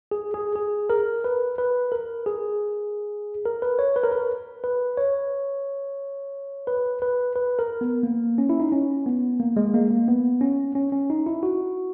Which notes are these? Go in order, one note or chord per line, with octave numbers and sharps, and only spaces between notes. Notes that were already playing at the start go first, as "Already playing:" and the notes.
G#4
G#4
G#4
A#4
B4
B4
A#4
G#4
A#4
B4
C#5
B4
A#4
B4
B4
C#5
B4
B4
B4
A#4
B3
A#3
C#4
E4
D#4
C#4
B3
A#3
G#3
A#3
A#3
B3
C#4
C#4
C#4
D#4
E4
F#4